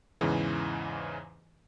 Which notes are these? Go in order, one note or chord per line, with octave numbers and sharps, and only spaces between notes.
E2 G#2 C#3 E3